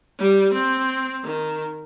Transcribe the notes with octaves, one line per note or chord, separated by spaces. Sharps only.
G3
C4
D#3